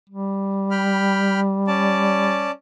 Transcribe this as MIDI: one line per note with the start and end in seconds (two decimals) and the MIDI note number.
0.10 2.51 55
0.71 1.40 79
0.71 1.40 83
0.71 1.40 89
1.67 2.51 61
1.67 2.51 74
1.67 2.51 81